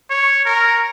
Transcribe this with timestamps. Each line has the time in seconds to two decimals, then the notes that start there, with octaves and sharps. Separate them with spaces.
0.10 C#5
0.45 A#4